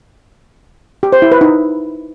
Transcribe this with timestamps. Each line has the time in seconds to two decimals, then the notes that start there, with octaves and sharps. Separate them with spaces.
1.03 G4
1.12 C5
1.22 E4
1.32 B4
1.41 D#4